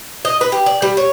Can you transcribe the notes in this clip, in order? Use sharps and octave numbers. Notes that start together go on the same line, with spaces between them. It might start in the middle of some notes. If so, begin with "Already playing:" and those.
D#5
B4
G4
D5
G3
C#5